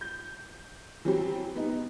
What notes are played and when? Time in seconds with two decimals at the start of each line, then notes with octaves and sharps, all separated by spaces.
0.01 G6
1.05 E3 F#3 G3 C4 G4
1.56 B3 D#4